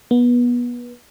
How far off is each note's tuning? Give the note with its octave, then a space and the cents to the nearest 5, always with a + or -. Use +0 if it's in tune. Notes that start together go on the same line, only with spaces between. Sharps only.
B3 -25